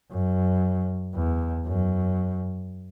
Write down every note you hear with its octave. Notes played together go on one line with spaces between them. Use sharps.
F#2
E2
F#2